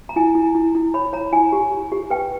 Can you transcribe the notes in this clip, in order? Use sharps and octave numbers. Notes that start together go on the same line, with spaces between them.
A#5
E4 G#5
E4
E4
E4
C#5 B5
C#5 A#5
E4 G#5
G4
G4
G4
B4 G5